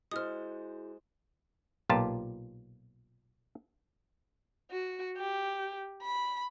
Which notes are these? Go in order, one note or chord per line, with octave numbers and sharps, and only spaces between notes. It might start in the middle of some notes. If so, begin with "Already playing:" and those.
G#3 E4 F#4 G#4 C5 D#6 F6
B1 A#2 F4 G4 A5
F#4
G4
B5